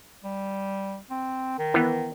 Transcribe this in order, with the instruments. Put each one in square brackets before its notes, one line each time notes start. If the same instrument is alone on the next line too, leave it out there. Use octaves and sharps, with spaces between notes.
[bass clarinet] G3
C4
D#3
[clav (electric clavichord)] E3 B3